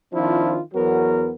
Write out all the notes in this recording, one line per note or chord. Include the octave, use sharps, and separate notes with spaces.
D#3 F3 C4 D4 E4 F4
E2 F#3 B3 F#4 A#4